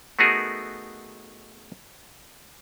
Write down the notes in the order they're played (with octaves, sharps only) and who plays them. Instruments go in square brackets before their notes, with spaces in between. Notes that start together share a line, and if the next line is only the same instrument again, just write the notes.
[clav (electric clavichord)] A3 B3 D#4 F#4 G#4 A#4